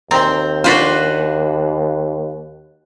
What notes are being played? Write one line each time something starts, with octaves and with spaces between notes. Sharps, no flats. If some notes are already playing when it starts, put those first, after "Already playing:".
D#2 C4 C5 A#5
D4 F4 F#4 B4 C5